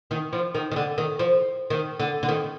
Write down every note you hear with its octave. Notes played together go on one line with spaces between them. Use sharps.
D#3
F3
D#3
D#3
D3
D#3
F3
D#3
D3
D3
D#3